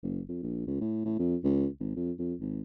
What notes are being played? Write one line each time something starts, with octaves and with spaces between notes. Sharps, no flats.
F#1
F2
A#1
C#2
A2
A2
F2
C#2
G#1
F2
F2
G#1